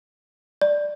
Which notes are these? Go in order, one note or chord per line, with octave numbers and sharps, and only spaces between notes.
D5